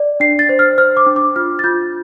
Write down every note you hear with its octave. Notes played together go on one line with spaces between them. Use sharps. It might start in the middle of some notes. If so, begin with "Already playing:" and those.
Already playing: D5
D4 C7
A6
C5
F6
C5 F6
D6
D4
D6
F4 F6
A6
F4 G6